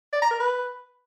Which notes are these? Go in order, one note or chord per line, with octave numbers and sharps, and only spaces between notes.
D5
A#5
A#4
B4